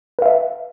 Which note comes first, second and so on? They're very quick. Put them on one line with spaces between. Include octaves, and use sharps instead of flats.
B4 F5 E5